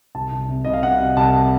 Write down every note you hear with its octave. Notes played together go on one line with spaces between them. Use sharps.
C2 A5
C2
C3
C2 D#5
F5
C3 F#5
C2
C2 A5